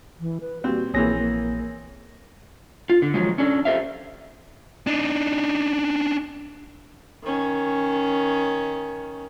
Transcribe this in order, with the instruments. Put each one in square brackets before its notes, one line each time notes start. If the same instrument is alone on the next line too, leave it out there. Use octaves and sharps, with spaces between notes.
[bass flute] E3
B4
[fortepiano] A#2 G3 C4 [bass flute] F#4
[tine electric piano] A#1 C#5 A#6 [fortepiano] E3 C4 G#4 [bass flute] A#3
[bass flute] A#3
[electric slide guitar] F4
D3
D#3 F3 F#3 G#3
C#4 D4 A4
G4 A4 C5 E5 F5
[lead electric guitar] D4 D#4
[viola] D#3 C#4